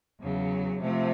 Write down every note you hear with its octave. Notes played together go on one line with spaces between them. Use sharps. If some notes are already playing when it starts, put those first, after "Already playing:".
E2 C#3 F#3
C3 F3 A3